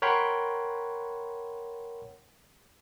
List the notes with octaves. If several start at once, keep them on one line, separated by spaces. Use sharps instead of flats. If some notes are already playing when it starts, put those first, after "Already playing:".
A#4 C#5 F#5 G5 B5 C6